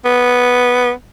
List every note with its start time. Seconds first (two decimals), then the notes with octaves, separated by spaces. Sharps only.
0.05 B3